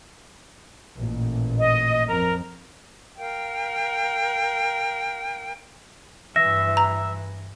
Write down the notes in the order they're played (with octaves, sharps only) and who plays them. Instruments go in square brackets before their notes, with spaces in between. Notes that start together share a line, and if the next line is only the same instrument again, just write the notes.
[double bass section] A1 A#2
[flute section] D#5
[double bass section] F2 [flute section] A#4
[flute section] A#4 F5 G5
[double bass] G2 E3 [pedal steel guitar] E5 [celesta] A#6
[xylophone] A#5